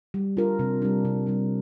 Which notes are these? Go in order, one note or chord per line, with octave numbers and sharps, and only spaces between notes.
G3
D4 F4 A#4
C3
G3 D4
C3
G3 D4